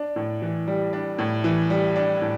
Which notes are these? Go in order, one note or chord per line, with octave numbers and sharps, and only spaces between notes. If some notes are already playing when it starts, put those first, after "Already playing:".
Already playing: D4
A2
E3
G3
D4
A2
E3
G3
D4
A2